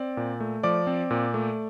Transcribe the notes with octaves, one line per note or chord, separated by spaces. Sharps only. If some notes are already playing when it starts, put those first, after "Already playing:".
Already playing: C4 D5
A#2
A3
F3 D5 D6
C4
A#2
A3